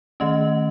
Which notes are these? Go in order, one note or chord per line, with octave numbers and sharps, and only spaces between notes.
D#3 A3 C#4 D#5